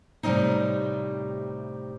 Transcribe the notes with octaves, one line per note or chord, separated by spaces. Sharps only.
A2 C3 G3 A3 C4 D#4